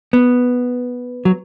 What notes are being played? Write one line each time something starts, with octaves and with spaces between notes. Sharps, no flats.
B3
F#3